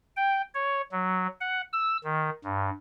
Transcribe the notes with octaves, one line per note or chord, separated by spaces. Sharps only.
G5
C#5
F#3
F#5
E6
D#3
G2